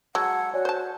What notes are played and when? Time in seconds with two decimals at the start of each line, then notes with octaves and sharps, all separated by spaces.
0.15 F#3 G#3 F#5 A5 E6 G#6
0.54 F#4 C#5 D5 G#5
0.65 C5 A5 G6